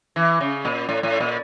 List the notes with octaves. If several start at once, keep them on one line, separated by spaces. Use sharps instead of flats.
E3
C#3
A#2
A2
A2
A#2